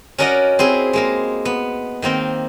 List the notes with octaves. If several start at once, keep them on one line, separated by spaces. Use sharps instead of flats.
C#4 F#4 A#4 D5 D#5 F#5
C4 E4 G#4
G#3 A#3 A#4
B3
D#3 A#3 C4 A#4